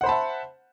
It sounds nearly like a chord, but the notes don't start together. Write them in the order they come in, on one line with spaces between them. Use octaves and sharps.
F#5 C5 B5 A5 E5